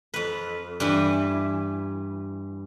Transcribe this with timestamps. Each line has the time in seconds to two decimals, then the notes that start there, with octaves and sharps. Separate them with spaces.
0.14 F2 B4
0.80 G2 E3